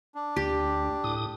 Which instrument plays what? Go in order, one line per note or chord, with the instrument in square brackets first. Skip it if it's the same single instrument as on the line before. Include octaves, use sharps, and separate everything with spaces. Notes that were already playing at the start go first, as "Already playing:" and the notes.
[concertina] D4
[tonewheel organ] D2 [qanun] G4
[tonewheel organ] A2 D#6